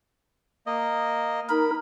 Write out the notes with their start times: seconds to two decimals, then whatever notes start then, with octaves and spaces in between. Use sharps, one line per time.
0.67 A#3 D#5
1.49 D#4 A#4 B5